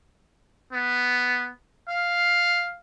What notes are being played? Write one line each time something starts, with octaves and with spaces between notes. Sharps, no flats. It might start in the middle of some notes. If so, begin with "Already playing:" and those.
B3
F5